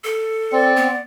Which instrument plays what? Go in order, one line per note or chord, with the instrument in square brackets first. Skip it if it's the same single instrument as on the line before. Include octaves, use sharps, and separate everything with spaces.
[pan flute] A4
[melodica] C4 [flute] D5
[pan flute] B3